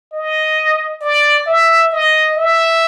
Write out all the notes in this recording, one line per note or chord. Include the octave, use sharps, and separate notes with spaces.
D#5
D5
E5
D#5
E5